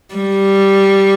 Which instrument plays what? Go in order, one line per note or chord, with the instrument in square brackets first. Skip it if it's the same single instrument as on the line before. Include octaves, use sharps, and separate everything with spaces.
[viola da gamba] G3